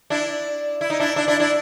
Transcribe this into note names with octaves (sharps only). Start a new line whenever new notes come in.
D4 E4
E4
D#4
D4 E4
D4 E4
D4 E4
D4 E4